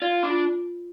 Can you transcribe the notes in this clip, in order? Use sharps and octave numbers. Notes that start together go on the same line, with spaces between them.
F4 D5
D4
F4